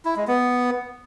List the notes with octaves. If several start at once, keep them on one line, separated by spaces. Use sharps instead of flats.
E4
G#3
B3